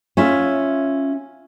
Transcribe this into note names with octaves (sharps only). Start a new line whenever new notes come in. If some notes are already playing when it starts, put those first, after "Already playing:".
C#4 F4 E5